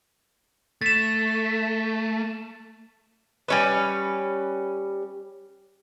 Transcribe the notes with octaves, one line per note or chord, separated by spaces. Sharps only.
A3 A6 E7
G3 C#4 B4